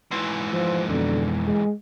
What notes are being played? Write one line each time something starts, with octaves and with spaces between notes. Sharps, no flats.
G#2 E3 C6
F3
F2 B2 D3
G#3